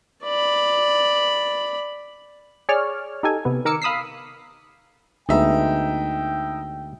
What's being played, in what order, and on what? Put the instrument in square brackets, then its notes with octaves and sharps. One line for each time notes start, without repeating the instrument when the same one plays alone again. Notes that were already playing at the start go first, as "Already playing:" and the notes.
[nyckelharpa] D5 B5
[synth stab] G#4 C#5 D5 F6
D#4 G4 A4 G#5
C3 B3
D#3 A#4 D6 E6 C#7
F5 B5 D#6 E6 B6 C7
[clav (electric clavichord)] D2 G#3 B3 [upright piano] D#4 E5 [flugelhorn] G5